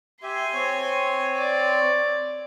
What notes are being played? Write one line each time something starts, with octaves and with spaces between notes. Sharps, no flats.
G4 E5 G#5 C6
C4 C#5
D5